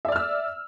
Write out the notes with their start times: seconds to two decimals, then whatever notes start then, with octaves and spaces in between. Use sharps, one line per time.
0.05 E5
0.08 D5
0.12 F6
0.16 E6